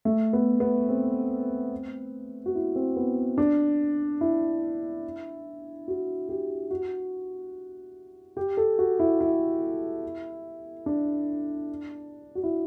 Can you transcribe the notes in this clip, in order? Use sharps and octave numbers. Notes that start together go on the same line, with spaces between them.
A3
B3
B3
C4
F#4
E4
C4
B3
D4
E4
F#4
G4
F#4
G4
A4
F#4
E4
E4
D4
F#4
E4